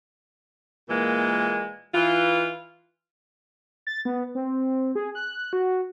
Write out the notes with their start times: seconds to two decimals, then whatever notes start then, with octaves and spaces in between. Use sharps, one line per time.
0.89 A#2 E3 G#3 A#3
1.94 E3 F4
3.87 A6
4.05 B3
4.35 C4
4.95 G#4
5.15 F#6
5.53 F#4